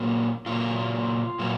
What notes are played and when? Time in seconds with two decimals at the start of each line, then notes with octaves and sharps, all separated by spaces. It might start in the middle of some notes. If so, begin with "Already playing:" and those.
Already playing: A#2 F#3 A#3 F#4
0.46 A#2 F#3 A#3 F4
1.39 A#2 F#3 A#3